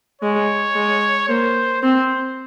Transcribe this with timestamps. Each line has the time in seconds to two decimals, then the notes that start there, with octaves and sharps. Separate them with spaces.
0.21 G#3 C#5
0.75 G#3
1.28 A#3 C5
1.82 C4 C5